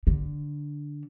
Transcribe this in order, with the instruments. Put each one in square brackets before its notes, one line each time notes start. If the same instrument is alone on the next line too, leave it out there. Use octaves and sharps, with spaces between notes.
[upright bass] D3